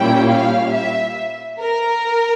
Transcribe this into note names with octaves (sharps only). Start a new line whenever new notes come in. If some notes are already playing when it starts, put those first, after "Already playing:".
Already playing: A#2 G3 C#4 E4 G5
F5
E5
A#4